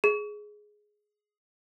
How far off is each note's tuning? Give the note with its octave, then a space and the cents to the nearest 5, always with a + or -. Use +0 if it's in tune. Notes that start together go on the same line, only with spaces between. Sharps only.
G#4 +10